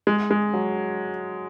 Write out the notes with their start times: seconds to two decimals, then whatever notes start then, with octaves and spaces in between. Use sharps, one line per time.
0.07 G#3
0.31 G#3
0.54 F#3